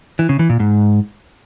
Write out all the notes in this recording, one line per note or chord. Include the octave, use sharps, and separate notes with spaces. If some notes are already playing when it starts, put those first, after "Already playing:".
E3
C#3
E3
A#2
G#2